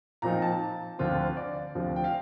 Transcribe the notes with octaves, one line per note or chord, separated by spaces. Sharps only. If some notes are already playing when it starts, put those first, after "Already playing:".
A#2 F3 C4 D#4 A#5
A5
D2 D3 F3 C4 F4
D5
D2 C3 F3
G5
F5